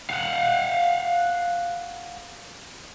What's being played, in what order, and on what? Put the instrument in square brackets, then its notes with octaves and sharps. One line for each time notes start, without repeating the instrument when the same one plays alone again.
[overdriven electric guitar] F5 F#5